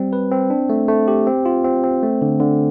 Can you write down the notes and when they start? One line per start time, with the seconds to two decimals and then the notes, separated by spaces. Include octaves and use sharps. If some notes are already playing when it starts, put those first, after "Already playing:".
Already playing: G3 C4
0.13 B4
0.32 C4
0.50 D4
0.69 A3
0.88 A3
1.08 G4
1.27 C4
1.45 F4
1.64 C4
1.84 C4
2.03 A3
2.22 D3
2.40 D3